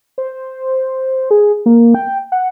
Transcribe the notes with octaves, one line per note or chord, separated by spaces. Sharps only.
C5
G#4
A#3
G5
F#5